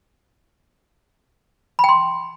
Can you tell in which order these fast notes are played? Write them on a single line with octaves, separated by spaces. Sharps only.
B5 G5 C6